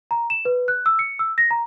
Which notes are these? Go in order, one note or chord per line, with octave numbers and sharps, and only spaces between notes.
A#5
E7
B4
F#6
E6
C#7
E6
A#6
A#5